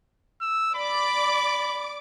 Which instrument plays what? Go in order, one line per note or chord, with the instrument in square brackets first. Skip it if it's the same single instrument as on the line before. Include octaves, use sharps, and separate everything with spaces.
[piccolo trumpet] E6
[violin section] D5 D6 [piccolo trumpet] B5